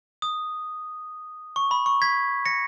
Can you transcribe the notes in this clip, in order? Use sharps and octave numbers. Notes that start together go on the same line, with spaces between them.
D#6
C#6
B5
C#6
G#6 B6
A#6 C#7